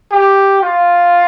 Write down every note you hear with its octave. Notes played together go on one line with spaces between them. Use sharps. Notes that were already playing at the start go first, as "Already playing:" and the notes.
G4
F4